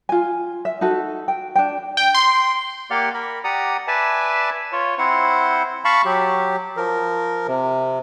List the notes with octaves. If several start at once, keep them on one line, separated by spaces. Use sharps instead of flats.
F4 G#5
E5
D#4 F#4 A4
G5
D4 G5
G5
C6
A#3 G4 D5 F5 F#5
A#4 B5
G4 D5 F#5 A#5 D#6
B4 D5 E5 G#5 A5
F4 C#5
C4 E4 C5 F#5
F5 A5 B5 C#6
F#3 G4
F3 A#4
C3